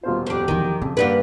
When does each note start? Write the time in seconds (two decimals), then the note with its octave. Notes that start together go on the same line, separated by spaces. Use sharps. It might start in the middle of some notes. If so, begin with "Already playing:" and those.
0.03 D#1 B2 F4 C5
0.27 F2 D4 G4
0.48 E2 D#3 F3
0.82 F2 C#3
0.97 G2 D3 G3 A#3 B4 D5 F#5